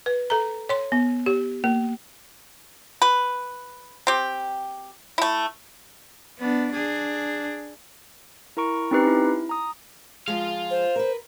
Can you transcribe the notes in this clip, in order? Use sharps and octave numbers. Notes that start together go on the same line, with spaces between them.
B4
A4 A#5
C#5 C6
B3
G4
A#3
B4
C4 G4
A3 E4
B3 D4
D4 G#4
E4 A#4 A#5 C#6 D7
C4 C#4 D#4 G4 B4 C7
E4
A#5 D#6
F3 G#3 F4 F5
C5
A#4 B4